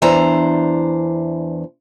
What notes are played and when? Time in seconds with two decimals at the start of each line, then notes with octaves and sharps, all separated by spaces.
0.02 E2 E3 D4 C5 A#5